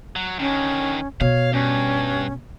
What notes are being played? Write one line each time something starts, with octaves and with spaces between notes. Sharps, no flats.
F#3
D3 D#3 C#4
B2 C#5 F5
G2 C#4